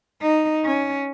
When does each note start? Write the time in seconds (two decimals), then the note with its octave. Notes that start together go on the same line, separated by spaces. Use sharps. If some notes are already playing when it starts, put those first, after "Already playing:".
0.22 D#4
0.65 C#4